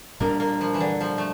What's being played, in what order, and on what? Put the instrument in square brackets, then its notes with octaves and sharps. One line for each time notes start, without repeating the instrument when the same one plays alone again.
[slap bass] A#2 G3 D4 [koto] A#3
[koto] A#3
F3
E3
D3
F3
A3